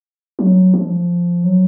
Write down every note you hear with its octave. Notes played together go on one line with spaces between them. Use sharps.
F#3
F3
F#3